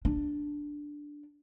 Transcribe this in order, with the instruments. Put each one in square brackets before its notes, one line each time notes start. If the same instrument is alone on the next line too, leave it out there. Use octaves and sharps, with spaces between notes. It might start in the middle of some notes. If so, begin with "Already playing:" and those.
[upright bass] D4